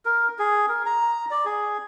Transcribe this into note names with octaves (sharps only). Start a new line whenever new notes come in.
A#4
G#4
A#4
A#5
D5
G#4